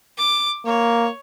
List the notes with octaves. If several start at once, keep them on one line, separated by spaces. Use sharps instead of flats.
D6
A#3 C#5